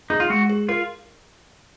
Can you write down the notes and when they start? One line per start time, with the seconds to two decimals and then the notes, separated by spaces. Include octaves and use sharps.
0.10 D#4 G#4
0.20 F4
0.30 G#3 F#4
0.49 G#4
0.69 F4 A#4